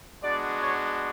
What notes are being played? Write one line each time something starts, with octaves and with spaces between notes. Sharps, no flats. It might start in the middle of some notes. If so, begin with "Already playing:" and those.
G#3 B3 D4 F#4 D5
C#5